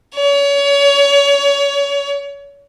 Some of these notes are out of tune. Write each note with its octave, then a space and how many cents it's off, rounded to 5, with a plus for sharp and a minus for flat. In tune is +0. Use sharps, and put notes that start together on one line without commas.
C#5 +30